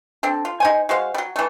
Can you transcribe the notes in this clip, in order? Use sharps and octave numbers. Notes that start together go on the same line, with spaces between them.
C4 D4 A4
F4
D#4 C5 G#5
G#3 F#4 C5 F5
F#3 G3
E3 A3